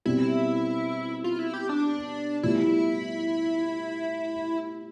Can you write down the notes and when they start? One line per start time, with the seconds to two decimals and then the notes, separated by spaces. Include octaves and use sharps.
0.06 B2 G3 C4 E4
1.24 F4
1.39 E4
1.53 G4
1.69 D4
2.43 A2 G3 B3 E4 F4